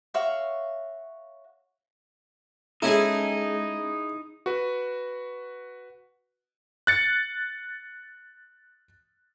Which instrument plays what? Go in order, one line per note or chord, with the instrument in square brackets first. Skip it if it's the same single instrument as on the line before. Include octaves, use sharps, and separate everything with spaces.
[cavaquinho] F#4 C#5 E5 F5
[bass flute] G#3 [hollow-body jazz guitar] C#4 A4 [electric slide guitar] D#4 [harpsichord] E4 G#4
[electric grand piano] F#4 B4
F#6 A6 C#7